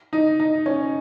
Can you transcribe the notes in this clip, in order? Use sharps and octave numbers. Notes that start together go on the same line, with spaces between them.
D#4
D#4
C#4